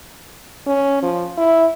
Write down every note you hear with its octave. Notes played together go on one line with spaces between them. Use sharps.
C#4
F3
E4